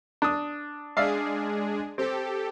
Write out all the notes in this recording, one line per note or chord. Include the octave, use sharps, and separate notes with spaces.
D4 D#6
G#3 D4 G#4 D5 E5 F5
C4 G4 A4